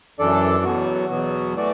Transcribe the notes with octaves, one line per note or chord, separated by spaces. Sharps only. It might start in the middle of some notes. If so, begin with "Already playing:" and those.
F#2 E3 D4 A4 D5
E2 B2 F#3 B3 F#4
E2 B2 F#3 B3 F#4
E3 A3 F#4 D5